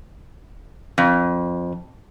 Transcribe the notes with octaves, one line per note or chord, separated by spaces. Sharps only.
F2